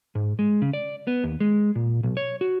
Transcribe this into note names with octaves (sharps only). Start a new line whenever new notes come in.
G#2
G#3
C#3
D5
B3
D#2
G#3
A#2
B1
C#5
F#4